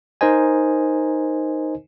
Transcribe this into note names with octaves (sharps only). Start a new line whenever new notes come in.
D#4 A#4 C5 D#5 G#5